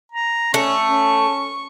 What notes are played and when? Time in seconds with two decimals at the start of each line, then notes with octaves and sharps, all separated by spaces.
0.12 A#5
0.54 A3 C#4 C#6
0.86 C#4